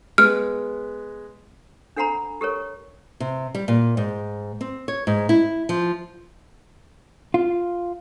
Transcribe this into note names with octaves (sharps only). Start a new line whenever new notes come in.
G#3 B3 F6
D4 A4 F#5 G#5 A#5 B5
G4 A4 A#4 C#5
C3
G3
A#2
G#2
C4
C#5
G#2
E4
F3
F4